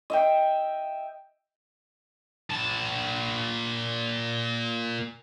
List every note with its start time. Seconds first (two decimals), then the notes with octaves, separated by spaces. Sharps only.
0.10 D#5 E5 G5
2.51 A#2 A5